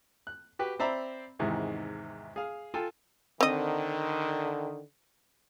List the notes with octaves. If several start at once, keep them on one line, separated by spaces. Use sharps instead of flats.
F#6
F#4 G4 B4
C4 C5 D5 E5 A#5 B5
E2 G#2 C3 D#3 E3
G#4 F5
F4 A4 G5 G#5
D3 D#3 C4 D#5